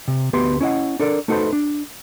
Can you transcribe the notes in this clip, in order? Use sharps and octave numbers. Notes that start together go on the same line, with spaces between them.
C3
D2 B3 G4 B4 C6
C#4 E4 D#5 F#5
D4 A4 A#4 D5
A3 D#4 F#4 A4 B4 C5
D4